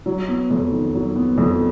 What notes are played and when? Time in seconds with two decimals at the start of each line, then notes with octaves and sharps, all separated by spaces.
0.06 F#3
0.28 B3
0.51 F2
0.72 D#3
0.94 F#3
1.16 B3
1.38 F2